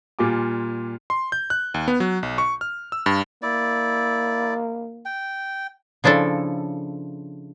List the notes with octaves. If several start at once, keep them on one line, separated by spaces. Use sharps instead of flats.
A#2 G3 F4 G#5 D6
C6
G6
F#6
D#2
B3
F#3
B1
C#6
F6
E6
G2
A#3 E4 D5
G5
C#3 F3 D4 E4 A4